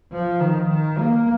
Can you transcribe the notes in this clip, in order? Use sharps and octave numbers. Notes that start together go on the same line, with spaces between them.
F3
D#3
D#3
A#3